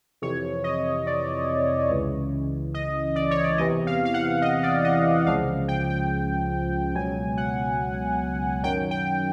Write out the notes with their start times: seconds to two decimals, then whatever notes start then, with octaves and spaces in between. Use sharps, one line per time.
0.22 F2 C3 E3 C#5
0.64 D#5
1.07 D5
1.90 C#2 C#3 E3
2.74 D#5
3.16 D5
3.31 C#5
3.44 D5
3.58 E2 C3 E3 D#5
3.87 F5
4.05 F5
4.14 F#5
4.42 D#5
4.63 D5
4.84 D#5
5.26 C#2 C#3 F3 F5
5.68 G5
5.90 G5
6.95 C#2 B2 F#3 G#5
7.38 F#5
8.63 F#2 D#3 F#3 G5
8.91 G5